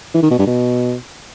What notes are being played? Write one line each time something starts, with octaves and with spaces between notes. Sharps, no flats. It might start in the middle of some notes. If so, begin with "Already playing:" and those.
E3
D#3
B2
G2
B2